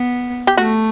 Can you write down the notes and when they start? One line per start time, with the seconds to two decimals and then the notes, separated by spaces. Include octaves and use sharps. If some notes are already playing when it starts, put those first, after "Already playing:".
Already playing: B3
0.47 G4
0.57 A3 F#4